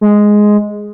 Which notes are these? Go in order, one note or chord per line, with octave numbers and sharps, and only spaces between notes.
G#3